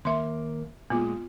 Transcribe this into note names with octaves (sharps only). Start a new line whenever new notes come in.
D#2 A#3 E5 C6
A#2 G#3 B3 F4